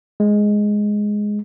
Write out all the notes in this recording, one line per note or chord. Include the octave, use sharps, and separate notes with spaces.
G#3